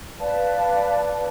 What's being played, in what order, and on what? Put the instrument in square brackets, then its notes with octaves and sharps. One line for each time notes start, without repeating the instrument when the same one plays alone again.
[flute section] B4 D5 F5 A5